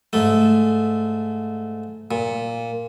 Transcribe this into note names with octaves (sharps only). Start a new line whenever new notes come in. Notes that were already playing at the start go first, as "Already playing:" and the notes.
G#2 A3
A#2